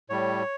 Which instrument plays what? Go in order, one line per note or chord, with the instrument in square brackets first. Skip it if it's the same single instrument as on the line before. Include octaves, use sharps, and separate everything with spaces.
[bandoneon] A2 G3 C#5